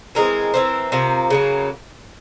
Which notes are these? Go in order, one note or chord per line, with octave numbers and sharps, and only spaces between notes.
E3 G#3 C4 A#4
E3 G#3 C4
C3 F3 A#3
C#3 F#3 A#3